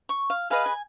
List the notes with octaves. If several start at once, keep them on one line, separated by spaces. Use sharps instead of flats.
C#6
F5
G#4 B4 D#5 F5
G#5